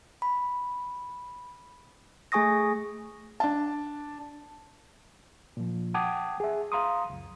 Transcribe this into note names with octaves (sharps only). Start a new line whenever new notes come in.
B5
A3 G#4 G#5 C#6 D#6 A#6
D4 A5
A#2 F3
F#5 G5 A5 D6 D#6 G#6
G#4 E5
F5 A#5 C6 D#6
C#2 F#2